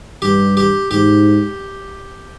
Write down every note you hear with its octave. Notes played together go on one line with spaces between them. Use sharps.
G2 G4
G4
G#2 G4